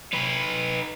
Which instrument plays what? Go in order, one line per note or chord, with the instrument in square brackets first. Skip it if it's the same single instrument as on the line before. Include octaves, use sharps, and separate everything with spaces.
[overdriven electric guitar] D#4 B4